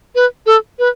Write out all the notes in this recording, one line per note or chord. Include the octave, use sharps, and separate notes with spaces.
B4
A4
B4